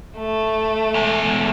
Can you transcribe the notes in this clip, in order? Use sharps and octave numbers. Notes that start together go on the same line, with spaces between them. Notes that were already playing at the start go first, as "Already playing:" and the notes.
A3
E2 G#3